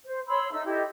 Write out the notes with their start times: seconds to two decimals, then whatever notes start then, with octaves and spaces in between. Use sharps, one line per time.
0.06 C5
0.28 C#5 B5 C6 E6
0.51 D#4 A4 E5 E6
0.64 E4 G4 A4 D#5